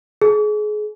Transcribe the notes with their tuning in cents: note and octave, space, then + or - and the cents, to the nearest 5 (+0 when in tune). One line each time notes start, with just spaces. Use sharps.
G#4 +30